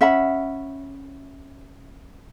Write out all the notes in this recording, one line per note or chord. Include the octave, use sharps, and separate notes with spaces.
C#4 E5 F#5 B5